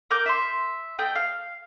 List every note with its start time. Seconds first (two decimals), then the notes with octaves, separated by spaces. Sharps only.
0.11 A#4 D6 G6
0.26 E5 C6
0.99 A3 D#5 G5
1.15 F5